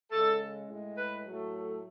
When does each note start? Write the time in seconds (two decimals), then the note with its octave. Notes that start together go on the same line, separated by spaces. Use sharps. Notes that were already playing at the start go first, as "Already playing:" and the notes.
0.11 C#3 G#3 A4
0.68 A2 G#3
0.96 B4
1.24 A2 F#3 A3
1.53 A4